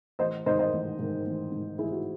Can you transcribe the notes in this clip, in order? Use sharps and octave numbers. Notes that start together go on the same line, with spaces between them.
A1 C5 D#5
G#2 D#3 G#3 C5 D#5
C5 D#5
A1
G#2 D#3 G#3
A1
G#2 D#3 G#3
A1 E4 G#4
F#4